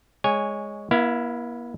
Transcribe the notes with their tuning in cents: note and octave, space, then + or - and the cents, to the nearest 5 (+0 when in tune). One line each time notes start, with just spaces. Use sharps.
G#3 +0 C#5 +5 G#5 -10
A#3 +45 E4 +0 F5 -40